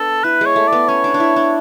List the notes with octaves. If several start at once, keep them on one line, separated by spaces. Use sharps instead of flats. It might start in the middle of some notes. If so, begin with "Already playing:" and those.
Already playing: B3 D4 A4
E4 B4
G#3
C#5
A3
D5
B3
C#4 C#5
D4
D4
E4
D4